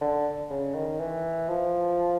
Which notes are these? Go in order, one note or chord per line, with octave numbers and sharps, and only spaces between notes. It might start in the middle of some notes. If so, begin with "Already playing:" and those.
D3
C#3
D#3
E3
F3